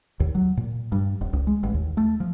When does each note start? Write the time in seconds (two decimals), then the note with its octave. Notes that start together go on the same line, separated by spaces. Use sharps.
0.20 D#2
0.35 F#3
0.57 A#2
0.92 G2
1.21 D#1
1.33 C#2
1.47 G#3
1.63 A1
1.74 D#2
1.97 A3
2.20 F3